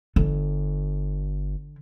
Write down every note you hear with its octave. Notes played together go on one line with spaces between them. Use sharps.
G1 D3